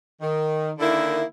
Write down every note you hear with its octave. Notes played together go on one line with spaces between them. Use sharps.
D#3
D3 D#3 A#3 E4